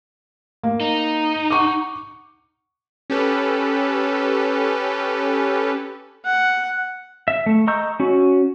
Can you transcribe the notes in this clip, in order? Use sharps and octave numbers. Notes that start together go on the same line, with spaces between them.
A#3
D#4
F#5 C#6 D6
C#4 G4 A4 B4
F#5
E5
A3
D#5 A#5 C#6 E6 G6
C#4 F#4